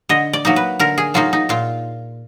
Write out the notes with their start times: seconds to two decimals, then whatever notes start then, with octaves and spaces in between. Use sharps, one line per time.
0.09 D3 D#5
0.33 D5
0.45 F#3 A#3 D#4
0.56 B4
0.79 D3 A#4
0.98 G#4
1.14 F#3 A#3 D#4 F4
1.33 D#4
1.49 A#2 F4